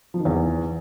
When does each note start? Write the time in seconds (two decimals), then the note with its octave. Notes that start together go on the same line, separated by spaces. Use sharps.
0.14 F3
0.20 D#3
0.25 E2